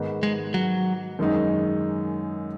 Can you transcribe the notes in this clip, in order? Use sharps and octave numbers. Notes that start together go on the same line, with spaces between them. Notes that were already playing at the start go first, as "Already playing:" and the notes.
Already playing: G#2 D#3 B3 D#4
G#3
F#3
F#2 D#3 G#3 D#4